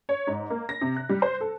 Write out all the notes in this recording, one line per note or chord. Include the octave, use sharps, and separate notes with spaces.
C#5
G#2
A#3
A#6
C3
F#6
G3
C5
A4